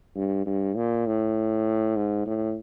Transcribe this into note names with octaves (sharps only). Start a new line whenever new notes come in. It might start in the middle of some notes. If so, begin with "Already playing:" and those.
G2
G2
A#2
A2
G#2
A2